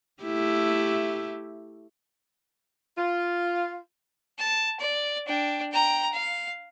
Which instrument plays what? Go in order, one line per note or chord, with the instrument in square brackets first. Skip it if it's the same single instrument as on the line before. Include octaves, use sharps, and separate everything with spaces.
[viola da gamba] A3 E4 G4
[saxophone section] F4
[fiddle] A5
D5
D4 G5
G5 A#5
F5